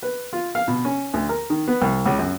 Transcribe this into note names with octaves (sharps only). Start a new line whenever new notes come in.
B4
F4
F5
B2
C#4
D2
A#4
D#3
B3
C2
C#2
F#2